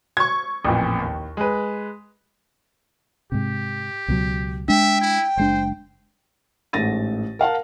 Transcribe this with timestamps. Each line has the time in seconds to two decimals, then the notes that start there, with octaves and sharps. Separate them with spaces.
0.17 C#6 G#6
0.65 A1 F2 A#2
1.02 D#2
1.37 G#3 B4
3.32 G#2 C3 G4
4.08 C#2 B2 F#3
4.68 G#3 D4 E5 G5
5.01 E4
5.37 F#1 G#3 D4 C5
6.73 A1 G#2 A3 A6 A#6 D#7
7.39 A#4 F5 F#5 A5